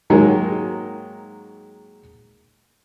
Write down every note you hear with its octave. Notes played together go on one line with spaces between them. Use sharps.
G#2 D#3 F#3 G#3 A#3